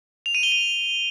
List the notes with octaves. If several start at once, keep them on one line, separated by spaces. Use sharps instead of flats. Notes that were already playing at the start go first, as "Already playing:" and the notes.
F7
D#7
G7
D#7